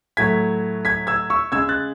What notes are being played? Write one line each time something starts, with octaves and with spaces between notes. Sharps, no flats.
A2 F#3 A3 G#6 B6
G#6 B6
E6 G#6
C#6 E6
C#3 G#3 E6 G#6
F#6 A6